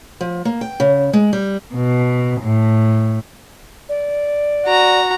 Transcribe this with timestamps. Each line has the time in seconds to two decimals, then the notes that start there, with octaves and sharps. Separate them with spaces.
0.21 F3
0.45 A#3
0.61 G5
0.80 C#3
1.13 G#3
1.33 G3
1.74 B2
2.40 A2
3.89 D5
4.66 F#4 A#5